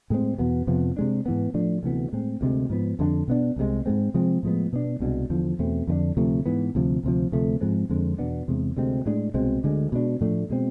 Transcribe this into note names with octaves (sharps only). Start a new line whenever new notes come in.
A2 G#3 C4
E2 B2 B3
F2 C3 F3 B3
C3 G#3 D4
G#2 E3 B3
A2 F3 A3 D4
D2 C3 E3 B3
A2 G#3 C4
D2 C3 G#3
G#2 F3 B3
F2 D3 G#3 D4
B2 B3 D4
C2 C3 G#3
G#2 G#3 C4
C3 F3 G#3 C4
A2 F3 G#3 B3
B2 B3 D4
C2 B2 G#3 D4
E2 D3 F3
E2 B2 A3 C4
F2 D3 A3 D4
D2 C3 F3 A3
G#2 E3 B3
D2 C3 F3
D2 C3 F3
D2 C3 F3 A3
G#2 F3 G#3 C4
F2 D3 G#3 C4
E2 B2 B3 D4
E2 C3 G#3
D2 C3 G#3 C4
A2 G#3 D4
C2 B2 G#3 C4
D2 D3 G#3
B2 G#3 D4
A2 F3 A3 D4
B2 G#3 C4